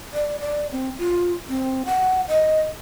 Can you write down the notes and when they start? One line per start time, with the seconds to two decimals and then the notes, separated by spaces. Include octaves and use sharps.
0.13 D5
0.40 D5
0.72 C4
0.98 F4
1.49 C4
1.86 F#5
2.28 D#5